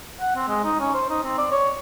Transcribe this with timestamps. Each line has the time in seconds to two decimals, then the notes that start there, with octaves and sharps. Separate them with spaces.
0.21 F#5
0.36 C4
0.48 G#3
0.64 D#4
0.80 C#4
0.94 C5
1.10 D#4
1.23 C4
1.38 D5
1.52 C#5